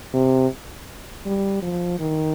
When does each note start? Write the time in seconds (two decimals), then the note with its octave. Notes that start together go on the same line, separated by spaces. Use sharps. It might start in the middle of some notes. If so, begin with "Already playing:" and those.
0.14 C3
1.26 G3
1.62 F3
1.99 D#3